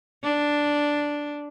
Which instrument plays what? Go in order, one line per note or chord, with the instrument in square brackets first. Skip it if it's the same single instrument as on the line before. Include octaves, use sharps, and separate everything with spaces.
[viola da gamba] D4